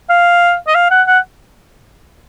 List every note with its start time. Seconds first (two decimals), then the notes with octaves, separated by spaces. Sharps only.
0.10 F5
0.67 D#5
0.75 F5
0.91 F#5
1.07 F#5